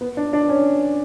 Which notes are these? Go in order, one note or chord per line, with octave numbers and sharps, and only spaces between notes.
B3
D4
D4
C#4